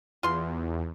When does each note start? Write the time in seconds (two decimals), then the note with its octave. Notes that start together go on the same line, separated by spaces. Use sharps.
0.23 E2 F4 C6